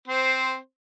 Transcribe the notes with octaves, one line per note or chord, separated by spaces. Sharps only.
C4 C5